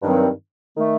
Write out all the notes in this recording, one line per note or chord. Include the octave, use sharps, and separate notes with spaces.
G2 D#3 F#3 C4
D#3 A3